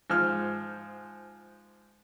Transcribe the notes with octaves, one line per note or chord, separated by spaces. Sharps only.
G#2 F3 F6